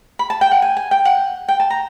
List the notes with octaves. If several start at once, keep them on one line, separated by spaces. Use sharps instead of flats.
B5
A5
G5
F#5
G#5
G#5
G5
F#5
G5
A5
A#5